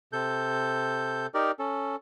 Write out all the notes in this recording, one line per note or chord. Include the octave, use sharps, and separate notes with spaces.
C3 A4 G6
D#4 G4 A#4 D5
C#4 A4